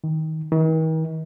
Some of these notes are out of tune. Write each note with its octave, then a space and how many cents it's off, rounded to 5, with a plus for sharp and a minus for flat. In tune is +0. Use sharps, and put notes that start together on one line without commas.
D#3 +25
D#3 +45